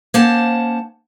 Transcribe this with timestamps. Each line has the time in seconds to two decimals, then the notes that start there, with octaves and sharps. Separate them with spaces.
0.14 A#3 C#4 C5 F#5 A5